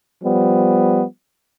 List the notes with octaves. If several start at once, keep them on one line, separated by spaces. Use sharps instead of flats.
F3 G3 B3